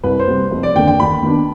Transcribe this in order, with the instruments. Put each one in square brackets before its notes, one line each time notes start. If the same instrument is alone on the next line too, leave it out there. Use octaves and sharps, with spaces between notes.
[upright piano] C2 [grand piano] B4
[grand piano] C5
[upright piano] C3 G3
F1
[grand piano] D5
[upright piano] D#2 [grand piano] G5
[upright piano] D3
[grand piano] G5
[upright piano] D#2 [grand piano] B5
[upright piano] D#3 B3 D4